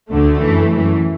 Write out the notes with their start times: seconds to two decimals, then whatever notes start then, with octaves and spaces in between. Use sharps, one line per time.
0.10 D2 D3 A3
0.41 F#2 E3
0.71 F#2 E3